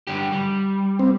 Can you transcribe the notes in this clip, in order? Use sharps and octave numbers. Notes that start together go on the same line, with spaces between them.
G2 D3 G4
G3
C4